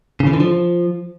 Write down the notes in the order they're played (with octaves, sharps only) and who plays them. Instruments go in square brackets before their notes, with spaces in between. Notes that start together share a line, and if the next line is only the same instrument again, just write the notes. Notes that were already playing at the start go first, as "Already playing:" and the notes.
[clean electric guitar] C#3
E3
D3
F3